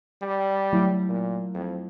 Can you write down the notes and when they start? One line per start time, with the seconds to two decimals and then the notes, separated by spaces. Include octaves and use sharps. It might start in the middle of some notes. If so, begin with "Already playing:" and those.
0.22 G3
0.73 F#3 A3 E4
1.09 A#2
1.54 F2